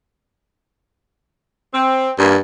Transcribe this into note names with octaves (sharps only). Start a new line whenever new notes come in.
C4
G2 A#3